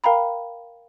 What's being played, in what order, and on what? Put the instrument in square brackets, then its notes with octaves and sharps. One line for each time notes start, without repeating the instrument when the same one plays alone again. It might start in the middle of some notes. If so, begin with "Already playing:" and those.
[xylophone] A#4 F5 G5 A#5 B5